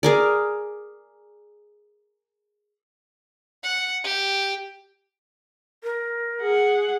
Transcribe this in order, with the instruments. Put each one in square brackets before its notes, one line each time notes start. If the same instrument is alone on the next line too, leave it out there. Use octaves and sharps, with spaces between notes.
[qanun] G#4 A#4 D5
[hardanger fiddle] F#5
G4
[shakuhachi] A#4
[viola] G#4 F#5